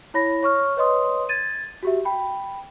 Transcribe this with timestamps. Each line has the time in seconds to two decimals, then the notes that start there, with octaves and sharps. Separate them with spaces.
0.14 E4 C#5 B5 A#6
0.43 C#5 C#6 F6
0.77 B4 C#5 D#5 C6 D#6
1.29 G#6 A6 D#7
1.83 F#4 G4 E5
2.05 G5 B5